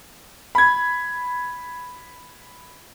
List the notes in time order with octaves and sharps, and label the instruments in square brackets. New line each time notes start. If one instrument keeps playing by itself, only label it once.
[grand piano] B5 G#6